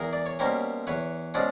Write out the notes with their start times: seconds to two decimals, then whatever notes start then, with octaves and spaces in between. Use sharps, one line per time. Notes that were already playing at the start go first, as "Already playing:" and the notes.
Already playing: E2 G#4 A#4
0.13 D5
0.26 C#5
0.39 B2 G3 A#3 C#4 A#4 C5
0.87 E2 B4 C#5
1.34 B2 G#3 C#4 C5 D5